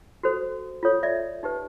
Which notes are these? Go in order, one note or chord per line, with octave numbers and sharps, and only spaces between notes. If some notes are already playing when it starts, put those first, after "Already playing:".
F#4 A4 C5
F4 A4 C#5
D5 E5
D#4 G4 B4